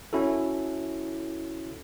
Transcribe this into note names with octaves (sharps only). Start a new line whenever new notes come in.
C#4 E4 F#4 A4